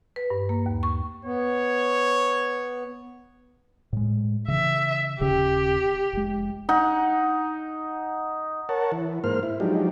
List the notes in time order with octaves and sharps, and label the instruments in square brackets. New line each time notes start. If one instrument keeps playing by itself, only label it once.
[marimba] B4
G2
A#3
D#2
C#6
[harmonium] B3 [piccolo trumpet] C#5
[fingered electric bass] A2 G#3
[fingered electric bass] C#3 E3 [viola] E5
[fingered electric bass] D#1 C#3 C#4 [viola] G4
[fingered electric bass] F1 G#3
[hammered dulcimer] D#4 F#5
[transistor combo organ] A#4 C#5 F#5 A5
E3
G#2 A#3 C5 F6
E4
F3 F#3 G#3 D4 D#4 G4